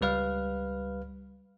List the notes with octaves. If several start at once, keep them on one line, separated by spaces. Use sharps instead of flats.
C#2 G3 B4 F5 F6